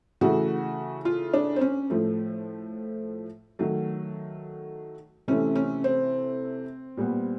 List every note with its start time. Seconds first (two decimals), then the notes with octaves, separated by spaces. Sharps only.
0.21 C#3 E3 A3 F#4
1.05 F4
1.34 D4
1.56 C4
1.61 C#4
1.90 A2 F3 A3
3.59 D#3 F#3 A3
5.28 C3 E3 A3 C#4
5.55 C#4
5.84 C4
6.97 A#2 G3 B3